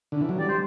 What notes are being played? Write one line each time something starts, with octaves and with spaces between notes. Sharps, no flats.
D3
E3
F#3
G3 D5
C5